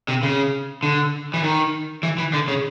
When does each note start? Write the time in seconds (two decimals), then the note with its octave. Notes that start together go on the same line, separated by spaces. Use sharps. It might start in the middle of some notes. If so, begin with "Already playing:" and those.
0.08 C3
0.23 C#3
0.83 D3
1.34 E3
1.43 D#3
2.03 E3
2.18 E3
2.33 D3
2.48 C#3